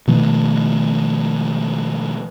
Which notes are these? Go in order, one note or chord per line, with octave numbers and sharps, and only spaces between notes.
B2 D#3 F3 A3